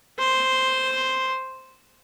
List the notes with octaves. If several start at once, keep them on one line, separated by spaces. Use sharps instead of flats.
C5 C6